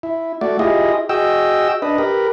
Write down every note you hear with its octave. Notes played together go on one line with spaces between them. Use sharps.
E4
A3 F#4 D5
E4 F4 G4 G#4 D#5
F#4 G#4 D#5 G5 E6
D4 B4 D#5
G4 A#4 B4